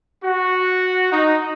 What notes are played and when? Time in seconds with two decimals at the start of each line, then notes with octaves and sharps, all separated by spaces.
0.23 F#4
1.13 D#4